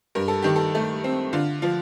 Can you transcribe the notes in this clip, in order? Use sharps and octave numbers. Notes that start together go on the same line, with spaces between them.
G2 A#4
A4
D#3 G4
A4
A3
C4
D3 F4
F3 F4